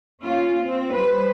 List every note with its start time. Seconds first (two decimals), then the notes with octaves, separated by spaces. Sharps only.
0.22 A#3 C#4 F4
0.63 C4
0.92 G3 B4 C5